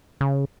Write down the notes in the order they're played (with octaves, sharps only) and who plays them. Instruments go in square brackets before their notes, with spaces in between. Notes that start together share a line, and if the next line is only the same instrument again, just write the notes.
[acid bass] C#3